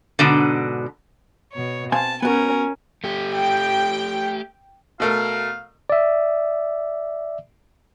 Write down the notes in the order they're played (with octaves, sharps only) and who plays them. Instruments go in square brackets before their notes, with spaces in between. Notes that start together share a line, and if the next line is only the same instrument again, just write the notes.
[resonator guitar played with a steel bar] G#2 B2 D3
[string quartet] B2 C#5
[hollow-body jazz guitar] C4 F5 G#5 [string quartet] A5
[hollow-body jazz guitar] B3 F#4 [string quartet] C#4 A#4 G#5
[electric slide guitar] A3 G4
[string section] G5
[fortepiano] B2 A3 A#4 [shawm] F5
[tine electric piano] D5 E5